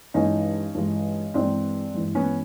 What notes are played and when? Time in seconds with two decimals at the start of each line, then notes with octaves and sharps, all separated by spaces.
0.14 G2 E3 G#3 C#4 D#4
0.75 G2 E3 G#3
1.34 G2 E3 G#3 C4 D4
1.94 G2 E3 G#3
2.15 B3 C#4